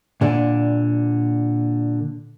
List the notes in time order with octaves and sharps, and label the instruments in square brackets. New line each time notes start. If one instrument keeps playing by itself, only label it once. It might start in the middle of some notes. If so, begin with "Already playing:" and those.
[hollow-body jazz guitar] A#2 D3 D5